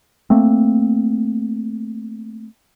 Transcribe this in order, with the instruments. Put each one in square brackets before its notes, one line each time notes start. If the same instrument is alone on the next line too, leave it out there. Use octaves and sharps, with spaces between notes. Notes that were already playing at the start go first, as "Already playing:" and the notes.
[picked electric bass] A3 A#3 C4